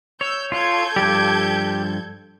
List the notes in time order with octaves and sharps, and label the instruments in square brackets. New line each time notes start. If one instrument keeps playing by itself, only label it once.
[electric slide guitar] C#5 [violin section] E6 G6
[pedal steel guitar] F4 [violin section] A4 G6 G#6
[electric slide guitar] G2 F3 G3 [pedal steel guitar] G4